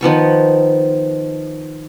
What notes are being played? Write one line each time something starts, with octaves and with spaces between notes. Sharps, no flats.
D#3 F3 B3 C#6